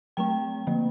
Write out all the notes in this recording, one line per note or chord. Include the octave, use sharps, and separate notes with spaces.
F#3 A3 C4 G5
D3 F3 A#3